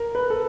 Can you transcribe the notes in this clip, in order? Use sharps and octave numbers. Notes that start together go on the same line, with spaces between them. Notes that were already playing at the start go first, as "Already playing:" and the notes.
Already playing: A#4
B4
A4